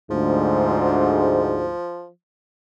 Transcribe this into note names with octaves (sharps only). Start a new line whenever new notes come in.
D2 G#2 F3